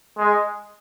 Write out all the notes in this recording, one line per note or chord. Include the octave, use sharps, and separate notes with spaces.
G#3